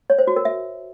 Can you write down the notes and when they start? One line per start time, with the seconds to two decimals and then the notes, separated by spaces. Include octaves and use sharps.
0.10 C#5
0.19 C5
0.27 F#4
0.36 A#4
0.45 E5